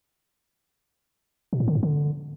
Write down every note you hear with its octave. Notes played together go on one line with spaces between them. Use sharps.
B2
A2
D3
G2
D3